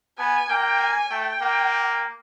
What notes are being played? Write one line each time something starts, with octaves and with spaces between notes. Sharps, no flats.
B3 G#5
A#3 G5
G#5
A3 G5
A#3